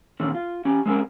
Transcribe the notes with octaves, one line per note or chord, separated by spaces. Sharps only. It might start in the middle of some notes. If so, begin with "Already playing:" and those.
A#2 D3 D#3 C4 C#4
F4
C#4 G4
G#3 C4 C#4 A#4